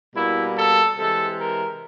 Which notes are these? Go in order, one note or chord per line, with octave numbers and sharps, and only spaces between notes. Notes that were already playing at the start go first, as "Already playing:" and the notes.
B2 G3 A#3 E4
A4
C3 E3 G#3 A4
A#4